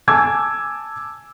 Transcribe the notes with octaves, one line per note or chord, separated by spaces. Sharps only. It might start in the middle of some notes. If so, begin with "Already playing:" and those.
G#5 A5 D6 E6 G#6